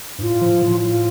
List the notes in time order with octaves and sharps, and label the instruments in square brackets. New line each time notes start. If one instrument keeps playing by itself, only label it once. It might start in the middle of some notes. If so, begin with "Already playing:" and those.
[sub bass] G2
[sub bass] A2 [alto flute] F4
[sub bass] F3
A2
[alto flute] F4